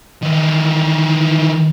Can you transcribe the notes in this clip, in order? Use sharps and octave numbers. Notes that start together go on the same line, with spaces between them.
D#3 E3